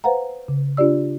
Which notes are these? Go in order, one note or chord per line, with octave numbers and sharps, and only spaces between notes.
B4 C5 F5 F#5 A#5
C#3
D4 F4 G4 D5 E6